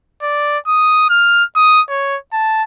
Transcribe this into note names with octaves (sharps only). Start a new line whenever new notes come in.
D5
D#6
F6
D#6
C#5
A5